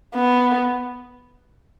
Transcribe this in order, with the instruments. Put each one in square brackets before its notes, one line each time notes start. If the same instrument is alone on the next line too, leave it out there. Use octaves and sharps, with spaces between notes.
[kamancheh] B3